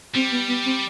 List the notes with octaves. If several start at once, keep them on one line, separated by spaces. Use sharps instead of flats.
G3 C4
B3
B3
C4